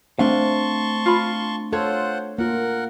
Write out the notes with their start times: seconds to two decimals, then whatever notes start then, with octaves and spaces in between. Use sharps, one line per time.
0.19 A3 C4 D4 F5 A5 C6 C#6
1.06 F4 B5
1.73 F4 A4 C5 C#5 F#5
2.38 A#3 F4 A#4 F#5